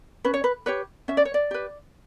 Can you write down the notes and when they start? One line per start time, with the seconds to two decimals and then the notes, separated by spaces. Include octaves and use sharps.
0.24 C#4 B4
0.34 C#5
0.44 B4
0.66 G4 B4 C#5
1.08 C#4 E5
1.17 D5
1.25 C#5
1.34 D5
1.51 G4 B4